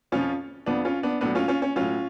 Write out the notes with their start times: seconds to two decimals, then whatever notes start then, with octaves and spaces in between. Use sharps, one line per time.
0.12 F2 F3 C#4 F4
0.66 F2 F3 B3 D4
0.85 C#4 F4
1.03 B3 D4
1.21 A2 F#3 B3 D4
1.35 C#4 F4
1.48 C#4 F4
1.62 C#4
1.76 A2 F#3 C#4 F4